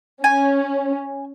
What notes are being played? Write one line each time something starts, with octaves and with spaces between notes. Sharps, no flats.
C#4 G#5